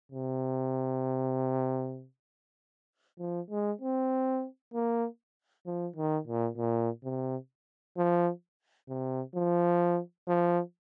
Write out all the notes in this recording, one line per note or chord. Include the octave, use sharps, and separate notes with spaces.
C3
F3
G#3
C4
A#3
F3
D#3
A#2
A#2
C3
F3
C3
F3
F3